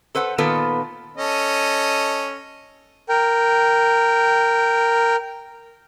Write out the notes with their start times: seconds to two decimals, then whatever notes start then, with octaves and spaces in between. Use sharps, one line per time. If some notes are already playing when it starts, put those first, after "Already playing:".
0.15 A4 B4 C5 F#5
0.38 A#2 D#3 B3 F4 A4 B4
1.17 C#4 A4 D#5
3.09 A#4 G5